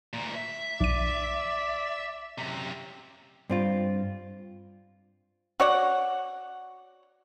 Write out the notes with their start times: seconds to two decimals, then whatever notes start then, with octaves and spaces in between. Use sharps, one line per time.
0.13 D2 A#2
0.35 E5
0.80 B1 D5 D#7
2.38 F#2 C3
3.50 G2 C4 F4
5.60 F#4 C#5 D5 F#5